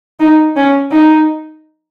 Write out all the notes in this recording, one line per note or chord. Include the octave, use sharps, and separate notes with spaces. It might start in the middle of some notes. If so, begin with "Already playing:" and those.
D#4
C#4
D#4